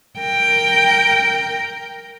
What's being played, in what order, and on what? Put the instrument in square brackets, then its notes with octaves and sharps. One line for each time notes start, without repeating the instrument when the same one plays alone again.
[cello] A#4 G5